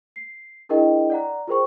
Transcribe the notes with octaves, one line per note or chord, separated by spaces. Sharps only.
C7
D4 E4 G#4 A#4 D#5 G5
D5 F#5 A#5
F4 G#4 A#4 C5 G5 C#6